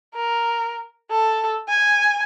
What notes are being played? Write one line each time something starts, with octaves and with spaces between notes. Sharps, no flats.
A#4
A4
G#5